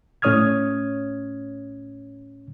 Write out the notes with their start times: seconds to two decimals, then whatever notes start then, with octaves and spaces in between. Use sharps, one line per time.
0.22 A2 C#4 C#5 D#6 F6 G#6